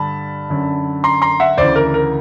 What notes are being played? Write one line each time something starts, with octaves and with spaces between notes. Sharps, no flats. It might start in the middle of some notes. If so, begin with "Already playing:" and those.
Already playing: G2 D3 A5 B5
F#2 D3
A#5 C6
A#5 C6
E5 F#5
D2 C#3 E3 C5 D5
A#4
A#4